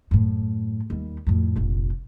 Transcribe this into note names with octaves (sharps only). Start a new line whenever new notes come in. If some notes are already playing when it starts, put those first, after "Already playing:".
F#2 A2
D#2 G3
F2 A2
F1 A#1